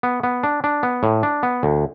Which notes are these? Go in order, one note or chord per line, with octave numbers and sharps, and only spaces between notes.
B3
B3
D4
D4
B3
A2
D4
B3
D2